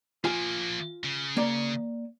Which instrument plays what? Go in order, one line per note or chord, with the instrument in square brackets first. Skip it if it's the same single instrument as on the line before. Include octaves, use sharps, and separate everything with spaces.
[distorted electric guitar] F3 A#3 [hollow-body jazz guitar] F4 G#5
[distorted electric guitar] C#3
[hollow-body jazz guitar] A#3 D5